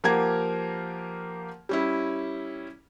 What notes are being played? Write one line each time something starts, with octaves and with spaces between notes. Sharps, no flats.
F3 A#3 G4 A#4 F#5 G#6
G3 C#4 E4